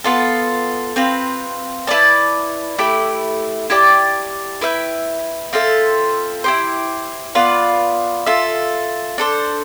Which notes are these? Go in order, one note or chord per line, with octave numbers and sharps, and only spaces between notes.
B3 F4 A4
C4 F4 B4
E4 B4 D5 A5
A3 E4 G4
E4 G4 D5 A5
E4 B4 E5 G5
C4 F4 A4 E5
E4 G4 C5
B3 F4 B4 D5
F4 A4 E5
D4 A4 C5